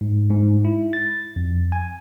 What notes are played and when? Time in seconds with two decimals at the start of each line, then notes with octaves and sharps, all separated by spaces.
0.01 G#2
0.30 G#2
0.65 E4
0.93 A6
1.36 F2
1.72 G#5